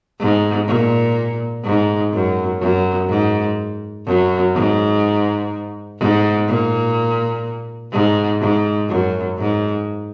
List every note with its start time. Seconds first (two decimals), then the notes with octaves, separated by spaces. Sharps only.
0.20 G#2
0.68 A#2
1.65 G#2
2.14 F#2
2.61 F#2
3.09 G#2
4.06 F#2
4.55 G#2
5.99 G#2
6.48 A#2
7.93 G#2
8.41 G#2
8.89 F#2
9.38 G#2